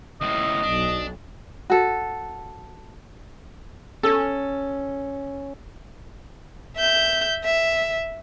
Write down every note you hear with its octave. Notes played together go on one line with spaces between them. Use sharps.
C#2 A2 D#5
B1 D4
F#4 A4
C#4 A4
E5 G6
E5